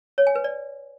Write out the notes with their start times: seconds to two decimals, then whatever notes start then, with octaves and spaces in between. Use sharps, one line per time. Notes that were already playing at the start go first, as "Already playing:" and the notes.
0.18 C#5
0.27 G#5
0.35 B4
0.44 D5